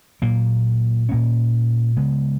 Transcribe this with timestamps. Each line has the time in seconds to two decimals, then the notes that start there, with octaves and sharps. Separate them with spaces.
0.22 A#2 F#3 A#3
1.09 A#2 A#3 C#4
1.97 C#3 G#3 B3